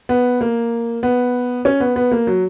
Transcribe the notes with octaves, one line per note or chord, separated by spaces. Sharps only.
B3
A#3
B3
C#4
B3
B3
A#3
F#3